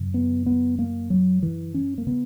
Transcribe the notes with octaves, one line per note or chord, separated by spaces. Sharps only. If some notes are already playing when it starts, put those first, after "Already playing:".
Already playing: F#2 C#3
B3
B3
A#3
F#3
E3
C#4
A#3
C#3 B3